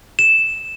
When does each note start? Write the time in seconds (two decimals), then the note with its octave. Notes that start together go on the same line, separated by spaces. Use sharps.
0.19 E7